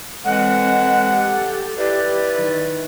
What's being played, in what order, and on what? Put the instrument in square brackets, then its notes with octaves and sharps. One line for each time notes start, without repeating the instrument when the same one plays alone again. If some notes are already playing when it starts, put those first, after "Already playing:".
[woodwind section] A2 E3 G#3 [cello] C4 [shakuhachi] F#5
[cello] G4 A4
[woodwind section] E4 B4 [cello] G4 [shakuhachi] D5
[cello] D#3